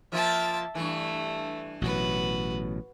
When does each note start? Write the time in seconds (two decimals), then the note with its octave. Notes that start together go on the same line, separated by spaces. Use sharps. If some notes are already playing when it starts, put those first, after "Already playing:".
0.12 F3 A#3 F4 E5 A5
0.75 G2 E3 A3
1.82 A1 B2 F#3 F#4 B4